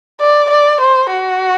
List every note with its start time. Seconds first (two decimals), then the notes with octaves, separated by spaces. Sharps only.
0.21 D5
0.50 D5
0.81 C5
1.10 F#4